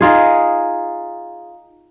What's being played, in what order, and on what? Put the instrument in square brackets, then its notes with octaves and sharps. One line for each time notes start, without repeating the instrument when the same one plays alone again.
[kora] D#4 F4 G#4